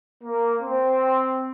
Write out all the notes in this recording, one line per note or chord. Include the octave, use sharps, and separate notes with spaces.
A#3
C4